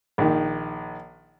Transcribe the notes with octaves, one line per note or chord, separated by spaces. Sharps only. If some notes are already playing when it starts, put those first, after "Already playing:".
A#1 D#3